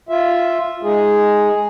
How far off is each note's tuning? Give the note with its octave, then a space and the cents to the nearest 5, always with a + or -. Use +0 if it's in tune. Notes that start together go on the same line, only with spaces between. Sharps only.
F4 +0 E5 +0
G#3 +0 D#4 +0 G#4 +0